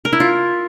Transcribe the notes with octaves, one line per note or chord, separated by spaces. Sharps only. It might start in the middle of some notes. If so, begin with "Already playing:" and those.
A#4
E4
F4